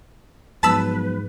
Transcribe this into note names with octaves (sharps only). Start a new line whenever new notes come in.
G#2 F3 F#3 B3 B4 A5 B5 E6